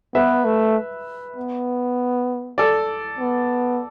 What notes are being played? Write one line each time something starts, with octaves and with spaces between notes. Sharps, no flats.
B3 B4 E5
A3
B3
A4 D5
B3